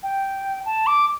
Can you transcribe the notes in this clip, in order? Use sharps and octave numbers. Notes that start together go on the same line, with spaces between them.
G5
A5
D6